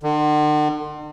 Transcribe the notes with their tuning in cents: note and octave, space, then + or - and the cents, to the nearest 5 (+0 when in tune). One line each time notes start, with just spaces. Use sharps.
D3 +45